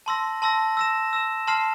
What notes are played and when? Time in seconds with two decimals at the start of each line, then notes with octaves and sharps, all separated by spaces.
0.06 A5 C6 E6 A#6
0.42 A5 C6 E6 A#6
0.77 E6 A#6 E7
1.13 E6 A#6 E7
1.47 A5 C6 F6 C7 E7